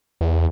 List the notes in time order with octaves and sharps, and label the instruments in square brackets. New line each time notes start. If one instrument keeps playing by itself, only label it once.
[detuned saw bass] E2